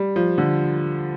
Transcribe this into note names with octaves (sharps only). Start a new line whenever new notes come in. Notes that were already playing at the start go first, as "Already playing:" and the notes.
Already playing: G3
F3
D3